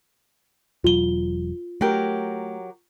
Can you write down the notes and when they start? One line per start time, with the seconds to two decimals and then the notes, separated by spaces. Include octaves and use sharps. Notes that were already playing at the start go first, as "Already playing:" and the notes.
0.84 E1 F#3 F4 G7
1.81 F#3 A3 G4 A#4